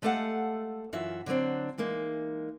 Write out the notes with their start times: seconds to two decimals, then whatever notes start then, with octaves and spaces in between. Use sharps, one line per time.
0.02 G#3 A3 G4 A4 F5 F#5
0.93 F#2 E3 F4 F#4 E5
1.26 D3 F#3 A3 C4 D4
1.78 E3 G#3 A#3 D#4